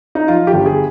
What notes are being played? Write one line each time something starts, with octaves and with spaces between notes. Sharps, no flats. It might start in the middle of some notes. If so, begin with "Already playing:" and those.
D#4
F3 F4
G4
G1
G#4